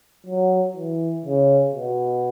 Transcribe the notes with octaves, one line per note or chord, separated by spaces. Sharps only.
F#3
E3
C#3
B2